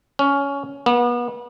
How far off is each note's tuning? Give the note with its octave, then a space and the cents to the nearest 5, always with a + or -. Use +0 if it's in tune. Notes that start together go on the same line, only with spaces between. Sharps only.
C#4 +15
B3 -35